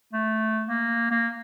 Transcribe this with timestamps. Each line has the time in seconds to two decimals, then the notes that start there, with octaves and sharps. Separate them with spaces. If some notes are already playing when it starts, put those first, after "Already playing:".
0.13 A3
0.68 A#3
1.11 A#3